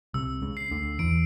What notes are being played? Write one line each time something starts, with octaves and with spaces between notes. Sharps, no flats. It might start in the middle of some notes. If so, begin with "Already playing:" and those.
C2 C3 E6
C#2 C#3
C7
D2 D3
E2 E3 D7